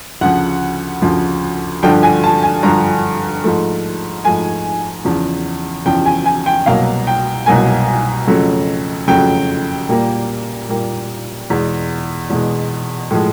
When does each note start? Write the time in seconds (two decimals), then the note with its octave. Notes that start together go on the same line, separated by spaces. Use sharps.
0.21 D2 C#3 F3 F#5
1.02 D2 C#3 F3
1.83 G2 D3 F3 G5
2.03 G#5
2.24 A5
2.43 G#5
2.63 G2 D3 F3 A#5
3.44 G#2 F3 A3
4.25 G#2 F3 A3 G#5
5.05 E2 C#3 F3
5.86 E2 C#3 F3 G5
6.06 G#5
6.26 G#5
6.46 G5
6.66 C2 B2 F#3 A#3 F5
7.07 G5
7.46 C2 B2 F#3 A#3 G#5
8.27 F2 C#3 F#3 A3
9.08 F2 C#3 F#3 A3 G5
9.89 A#2 G3 A#3
10.69 A#2 G3 A#3
11.50 E2 B2 G#3
12.30 E2 B2 G#3
13.11 A2 F3 G#3